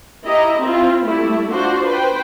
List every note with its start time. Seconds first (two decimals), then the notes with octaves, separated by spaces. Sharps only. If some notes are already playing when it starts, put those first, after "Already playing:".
0.25 E4 G4 D#5 A#5
0.63 C4 E4 F4
1.05 G3 A3 E4
1.52 D4 F4 F#4 C5
1.87 B4 C5 G5